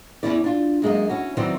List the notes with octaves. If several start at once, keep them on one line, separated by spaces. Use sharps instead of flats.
E2 A#2 E3 C#4 E4 D5
D4 F4
F#2 G#3 A#3 D#5
C#4 E4 F#4
D#3 E3 F#3 C4 C5 D5